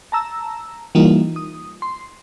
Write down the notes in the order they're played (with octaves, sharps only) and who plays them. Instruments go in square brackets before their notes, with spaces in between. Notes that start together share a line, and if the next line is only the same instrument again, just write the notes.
[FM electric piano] A5 A#5 E6
E3 G3 A#3 D#4 F4
D#6
C6